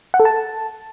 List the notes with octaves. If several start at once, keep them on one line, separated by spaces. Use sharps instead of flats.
F#5
A4
A5